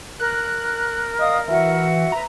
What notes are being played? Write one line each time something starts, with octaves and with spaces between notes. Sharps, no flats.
A#4 F#6
D5 D#5 F5 D#6
E3 F#4 E5
B4 A#5